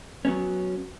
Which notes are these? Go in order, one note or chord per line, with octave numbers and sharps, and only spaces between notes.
F#3 B3 C#4